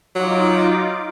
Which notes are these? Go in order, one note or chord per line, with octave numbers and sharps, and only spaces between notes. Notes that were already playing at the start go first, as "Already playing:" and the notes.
F#3 D#4 F4 D6